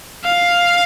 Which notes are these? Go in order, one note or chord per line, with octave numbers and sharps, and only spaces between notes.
F5